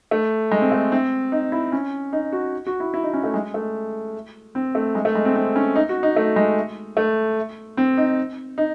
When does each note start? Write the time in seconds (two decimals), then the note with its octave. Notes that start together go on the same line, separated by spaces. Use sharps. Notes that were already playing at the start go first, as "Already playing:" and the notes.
0.11 A3
0.51 G#3
0.61 C4
0.72 A3
0.92 C4
1.32 D#4
1.52 E4
1.72 C#4
2.13 D#4
2.33 F#4
2.67 F#4
2.80 E4
2.94 E4
3.03 D#4
3.14 C#4
3.24 A3
3.34 G#3
3.54 A3
4.55 C4
4.75 A3
4.95 G#3
5.05 A3
5.15 G#3
5.25 C4
5.35 C4
5.56 C#4
5.76 D#4
5.89 F#4
6.03 D#4
6.16 A3
6.36 G#3
6.97 A3
7.77 C4
7.97 D#4
8.58 D#4